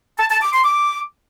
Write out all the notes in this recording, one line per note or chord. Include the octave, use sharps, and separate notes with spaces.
A5
A5
D6
C6
D6